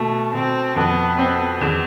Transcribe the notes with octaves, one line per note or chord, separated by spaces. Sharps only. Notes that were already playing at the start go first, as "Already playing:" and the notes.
Already playing: B2 A3
B2 C4
F2 B3
C4
E2